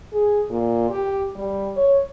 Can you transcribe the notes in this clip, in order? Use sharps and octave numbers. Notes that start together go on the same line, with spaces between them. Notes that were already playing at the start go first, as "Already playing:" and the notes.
G#4
A#2
G4
G3
C#5